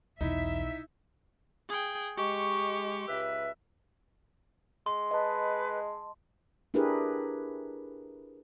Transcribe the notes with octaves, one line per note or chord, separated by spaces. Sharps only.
B1 E2 D#4 E4 E5
G#4 G5
G#3 G4 C#6
C#2 B4 E5
G#3 C6
B4 D#5 A5
D4 E4 G4 G#4 A#4 B4